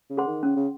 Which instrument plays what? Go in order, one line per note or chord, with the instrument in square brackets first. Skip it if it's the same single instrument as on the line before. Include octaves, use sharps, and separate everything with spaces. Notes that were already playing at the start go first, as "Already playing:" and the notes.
[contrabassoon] C#3
[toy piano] G#4 C5 F#5 C6
[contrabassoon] D#3
[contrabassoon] C#3 [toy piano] C#4
[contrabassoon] C#3